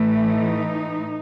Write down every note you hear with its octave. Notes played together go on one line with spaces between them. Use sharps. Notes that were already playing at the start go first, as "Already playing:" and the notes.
Already playing: A2 E3 A3
D#4